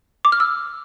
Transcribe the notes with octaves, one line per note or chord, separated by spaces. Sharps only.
D6
F6
E6